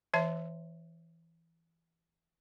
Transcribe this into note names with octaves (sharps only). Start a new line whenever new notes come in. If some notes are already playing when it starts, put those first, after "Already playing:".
E3 C#5 E5 A5